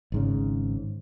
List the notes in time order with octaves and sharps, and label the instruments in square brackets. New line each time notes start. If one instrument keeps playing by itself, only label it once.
[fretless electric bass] G#1 G#2 C#3